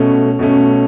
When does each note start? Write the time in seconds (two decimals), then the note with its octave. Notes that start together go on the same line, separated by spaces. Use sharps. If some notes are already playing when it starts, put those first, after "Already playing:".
Already playing: B2 A3 C#4
0.39 B2 A3 C#4